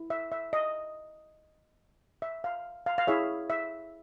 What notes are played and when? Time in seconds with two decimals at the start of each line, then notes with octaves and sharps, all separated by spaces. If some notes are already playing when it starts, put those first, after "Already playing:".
Already playing: E4
0.10 E5
0.32 E5
0.53 D#5
2.22 E5
2.44 F5
2.86 F5
2.98 F5
3.07 E4 G#4 C#5 E5
3.50 E5